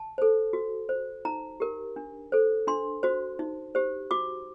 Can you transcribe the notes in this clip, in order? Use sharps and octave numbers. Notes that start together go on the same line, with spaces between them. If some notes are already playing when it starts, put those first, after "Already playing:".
Already playing: A5
A4 C5
F#4
C5
D#4 A#5
G4 A#4
D4
A4 C5
D4 C6
F#4 C5
D#4
G4 C5
F#4 D6